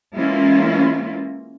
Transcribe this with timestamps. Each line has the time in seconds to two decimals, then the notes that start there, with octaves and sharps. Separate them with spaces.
0.16 E3 G#3 A#3 C#4 E4 F4